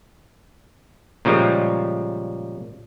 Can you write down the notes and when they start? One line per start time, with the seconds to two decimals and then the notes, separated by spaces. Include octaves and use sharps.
1.25 A#2 C#3 F3 G3 G#3